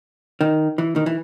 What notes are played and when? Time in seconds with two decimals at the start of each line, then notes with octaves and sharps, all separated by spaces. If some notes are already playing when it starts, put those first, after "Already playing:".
0.41 D#3
0.78 E3
0.96 D#3
1.06 E3